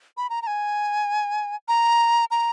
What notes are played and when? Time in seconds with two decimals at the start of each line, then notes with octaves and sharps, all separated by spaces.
0.17 B5
0.30 A#5
0.42 A#5
0.47 G#5
1.68 A#5
2.31 A#5